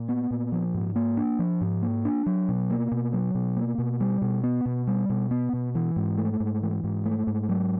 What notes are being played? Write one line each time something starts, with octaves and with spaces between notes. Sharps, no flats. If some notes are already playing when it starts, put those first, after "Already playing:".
Already playing: A#2
B3
A#2
F3
G#2
A#3
D4
F3
G#2
A#3
D4
F#3
B2
A#3
B2
F#3
B2
A#3
B2
G3
B2
B3
B2
G3
B2
B3
B2
E3
G#2
A3
G#2
E3
G#2
A3
G#2
F#3